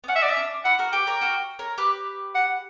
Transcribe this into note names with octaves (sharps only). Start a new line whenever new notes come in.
B3
C#4 F#5
E5
D5
C#4 E5
D4
E4 F#5
F#4 A#4
G4 B4 G5
A#4 C#5
F#4 A#4
A#4 C#5
G4 B4
F#5